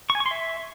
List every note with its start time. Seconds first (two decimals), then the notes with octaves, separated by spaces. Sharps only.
0.10 C#6
0.15 G#5
0.20 C#6
0.26 C6
0.31 E5